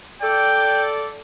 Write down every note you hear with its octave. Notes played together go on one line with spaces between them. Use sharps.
A4 D5 G5